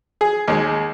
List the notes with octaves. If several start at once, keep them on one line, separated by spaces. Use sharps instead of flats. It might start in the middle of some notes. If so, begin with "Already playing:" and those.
G#4
D#2 G#3